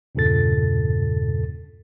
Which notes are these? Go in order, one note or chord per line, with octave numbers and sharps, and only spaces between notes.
E2 G2 A#2 C#3 A4 A6